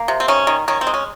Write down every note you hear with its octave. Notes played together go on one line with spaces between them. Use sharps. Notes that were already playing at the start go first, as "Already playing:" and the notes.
Already playing: A#3
C3
C4
D#3 C#4
D#3
D#3 C#4
C4
G#3
C#4